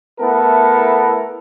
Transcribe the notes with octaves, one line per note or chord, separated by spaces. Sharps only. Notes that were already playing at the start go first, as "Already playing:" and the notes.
A3 B3 E4 A4 A#4